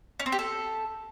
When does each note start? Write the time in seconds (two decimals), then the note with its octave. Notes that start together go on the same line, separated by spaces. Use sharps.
0.20 C#4
0.26 C4
0.32 G4
0.39 A4